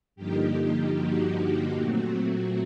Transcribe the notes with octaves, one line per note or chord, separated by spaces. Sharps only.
G2 D3 F3 A#3 D#4 G4
G4
F#4
A#2 F#3 A3 C4